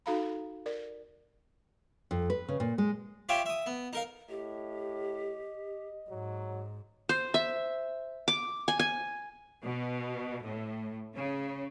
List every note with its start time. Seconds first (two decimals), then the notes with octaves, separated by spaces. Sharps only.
0.06 D#4 F#4 A4 F5 A#5 B5
0.66 A#4 D5
2.11 F2
2.30 B4
2.49 C#3
2.60 A#2
2.78 G#3
3.29 F4 G4 C#5 E5 F5 G5
3.46 E5 D#6
3.66 B3
3.93 D#4 A#4 F5
4.30 A2 G4 D#5
6.09 G#2 F#3
7.09 C5
7.34 E5
8.28 D6
8.68 G#5
8.79 G#5
9.62 B2
10.45 A2
11.15 C#3